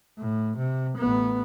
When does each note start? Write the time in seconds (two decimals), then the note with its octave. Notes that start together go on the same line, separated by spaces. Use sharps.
0.18 A2
0.57 C3
0.97 A1 B3